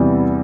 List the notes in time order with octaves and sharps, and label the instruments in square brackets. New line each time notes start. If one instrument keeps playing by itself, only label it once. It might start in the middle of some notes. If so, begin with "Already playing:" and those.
Already playing: [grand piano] E2 C3 E3 G3